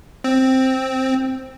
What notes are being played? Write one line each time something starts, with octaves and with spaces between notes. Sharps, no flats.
C4